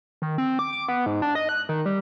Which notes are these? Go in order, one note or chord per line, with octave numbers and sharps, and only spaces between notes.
D#3
C4
D6
D6
B3
G#2
D4
D#5
F#6
D#3
G3